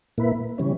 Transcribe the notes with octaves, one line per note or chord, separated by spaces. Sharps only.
A#2 A#3 E4 B4
C#3 E3 G3 C#4